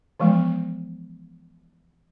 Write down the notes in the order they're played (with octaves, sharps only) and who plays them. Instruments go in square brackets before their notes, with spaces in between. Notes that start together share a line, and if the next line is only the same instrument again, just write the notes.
[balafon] E3 F3 G#3 B3